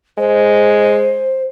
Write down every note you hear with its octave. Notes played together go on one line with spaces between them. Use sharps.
G#3 C5